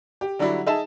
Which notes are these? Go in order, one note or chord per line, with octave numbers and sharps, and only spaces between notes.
G4
D3 F#3 G3 D4 E4
D#4 G#4 E5 G#5 A5 E7